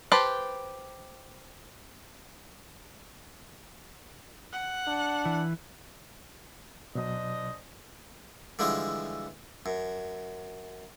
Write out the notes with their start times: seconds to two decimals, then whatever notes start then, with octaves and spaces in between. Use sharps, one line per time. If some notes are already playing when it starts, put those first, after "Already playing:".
0.12 G4 B4 C5 A5
4.53 F#5
4.88 D4
5.26 E3
6.95 B2 F#3 D4 C5 D#5
8.59 D3 E3 F3 G3 G#3
9.66 F#2